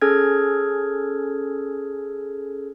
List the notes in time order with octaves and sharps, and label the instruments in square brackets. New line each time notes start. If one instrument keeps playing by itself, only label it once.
[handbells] C#4 G#4 A4 F6 G#6